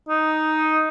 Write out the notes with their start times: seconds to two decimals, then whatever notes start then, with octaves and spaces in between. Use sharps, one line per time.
0.09 D#4